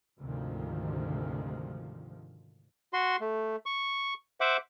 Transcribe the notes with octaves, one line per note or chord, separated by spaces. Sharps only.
D2 G#2 C3 D#3 F3
F#4 C6
A3
C#6
C5 E5 F#5 D6